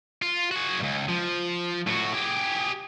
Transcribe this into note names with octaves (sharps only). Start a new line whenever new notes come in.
F4
F#4 G#4
C#2 G2
F3
A2 F#4
G4 G#4